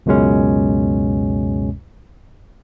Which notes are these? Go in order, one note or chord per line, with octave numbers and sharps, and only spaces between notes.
C#2 F#2 B2 G#3 C#4